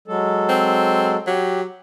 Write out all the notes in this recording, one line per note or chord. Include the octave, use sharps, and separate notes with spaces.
F#3 G#3 A4
C4
F#3 G4